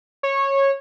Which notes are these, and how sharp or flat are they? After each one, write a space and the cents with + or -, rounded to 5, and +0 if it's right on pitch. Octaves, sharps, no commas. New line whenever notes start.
C#5 -15